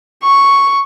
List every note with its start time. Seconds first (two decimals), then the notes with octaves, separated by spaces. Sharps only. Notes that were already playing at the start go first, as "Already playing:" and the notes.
0.23 C#6